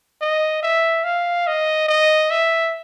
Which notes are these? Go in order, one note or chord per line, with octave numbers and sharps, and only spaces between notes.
D#5
E5
F5
D#5
D#5
E5